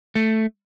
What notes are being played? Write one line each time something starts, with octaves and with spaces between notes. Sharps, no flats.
A3